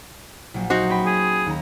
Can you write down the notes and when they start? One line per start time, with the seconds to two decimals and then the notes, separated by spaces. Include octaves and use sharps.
0.54 A#1 F#3
0.70 D#4 F#4 C5
0.89 C#4 G5 B5
1.06 G#4
1.46 D#2 A#5